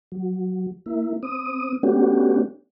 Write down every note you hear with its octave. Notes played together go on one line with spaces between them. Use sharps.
F#3
A#3 E4
C4 D#6
A3 B3 C#4 D4 F#4 G4